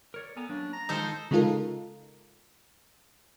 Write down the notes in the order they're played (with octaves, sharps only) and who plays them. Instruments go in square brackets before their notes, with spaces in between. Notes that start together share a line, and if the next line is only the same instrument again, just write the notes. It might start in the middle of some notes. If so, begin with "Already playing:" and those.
[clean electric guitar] A#4 C#5 D5
[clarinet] B3 [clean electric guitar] A4 G#5 A#5
[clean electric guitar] F#3 A#3 C#4 [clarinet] D4
[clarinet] A#5
[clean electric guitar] D#3 G#3 F4 [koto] D#4 A4 C5
[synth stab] C#3 G#3 D#4 F4 A4 A#4